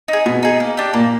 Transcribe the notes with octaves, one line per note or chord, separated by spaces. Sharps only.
D#4 G#4
B2 B3
D#4 G#4
A#3
D4 G4
A#2 A#3